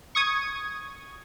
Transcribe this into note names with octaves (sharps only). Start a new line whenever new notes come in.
C#6 D#6 G#6